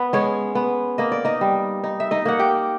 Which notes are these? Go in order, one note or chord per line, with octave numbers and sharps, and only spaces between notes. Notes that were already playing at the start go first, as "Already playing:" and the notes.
Already playing: B3 B4
G#3 C#4 C#5
B3
A#3 D#5
D5
D#4 D#5
G3
D#4
E5
D#4 D#5
A#3 F#5
G4 G5